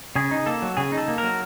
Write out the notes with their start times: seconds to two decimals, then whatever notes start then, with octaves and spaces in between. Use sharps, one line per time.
0.15 C#3 G#4
0.31 D#4
0.46 A#3 A4
0.62 F#3
0.77 C#3 G#4
0.92 D#4
0.98 A4
1.08 A#3
1.18 F#3 A#4